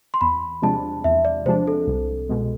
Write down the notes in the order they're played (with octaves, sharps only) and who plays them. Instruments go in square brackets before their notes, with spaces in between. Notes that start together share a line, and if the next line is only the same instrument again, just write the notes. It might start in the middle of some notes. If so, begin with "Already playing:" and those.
[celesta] C6
[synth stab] E2 [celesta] B5
[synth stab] C3 F3 G#3 D4 [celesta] A5
[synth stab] E2 [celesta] E5
[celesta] D5
[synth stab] C3 F3 G#3 D4 [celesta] C5
[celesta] A4
[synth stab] C2
B2 G#3